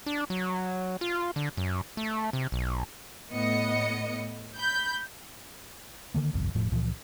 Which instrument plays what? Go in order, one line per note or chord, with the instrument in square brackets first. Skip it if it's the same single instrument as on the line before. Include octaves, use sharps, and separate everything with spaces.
[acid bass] D4
F#3
F4
D3
F#2
A3
C3
B1
[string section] A2 B3 D#5 C#7
B5 G6
[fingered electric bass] D3 D#3 A#3
G1 C2 F2
E1 A2 F3
C#2 A#2 E3 F3